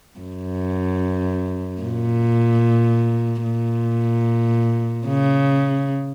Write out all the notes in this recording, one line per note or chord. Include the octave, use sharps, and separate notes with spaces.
F#2
A#2
A#2
C#3